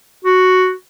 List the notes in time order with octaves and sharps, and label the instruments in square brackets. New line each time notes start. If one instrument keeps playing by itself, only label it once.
[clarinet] F#4